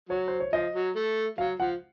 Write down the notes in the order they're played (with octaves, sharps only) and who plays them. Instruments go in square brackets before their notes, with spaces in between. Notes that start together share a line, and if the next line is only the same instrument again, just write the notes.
[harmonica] F#3 [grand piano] C#5
[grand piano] C5
C#5
[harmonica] F3 [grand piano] D#5
[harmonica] F#3
A3
[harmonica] F#3 [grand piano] F5
[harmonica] F3 [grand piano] F#5